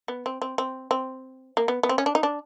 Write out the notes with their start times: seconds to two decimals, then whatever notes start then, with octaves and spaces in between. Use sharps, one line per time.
0.08 B3
0.26 C4
0.42 C4
0.58 C4
0.91 C4
1.57 A#3
1.68 B3
1.83 B3
1.89 C4
1.98 C#4
2.06 D4
2.15 D#4
2.23 D4